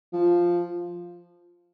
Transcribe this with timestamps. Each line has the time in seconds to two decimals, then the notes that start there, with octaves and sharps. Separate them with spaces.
0.13 F3